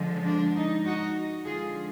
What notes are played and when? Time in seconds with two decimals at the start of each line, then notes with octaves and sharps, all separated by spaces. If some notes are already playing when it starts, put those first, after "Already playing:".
Already playing: D3 F3 G#3
0.26 D4
0.55 D#4
0.85 D#4 F#4
1.45 D3 F3 G#3 F4 G#4